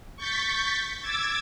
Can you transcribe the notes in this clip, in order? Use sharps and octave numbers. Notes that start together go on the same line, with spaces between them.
C#6 G6 A6 B6
D6 E6 G#6 A6